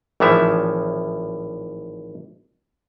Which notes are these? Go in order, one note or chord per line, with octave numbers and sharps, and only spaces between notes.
G#1 A2 E3 F3 E5